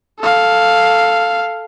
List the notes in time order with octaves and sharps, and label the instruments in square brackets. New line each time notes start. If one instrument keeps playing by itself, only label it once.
[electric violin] A4 F5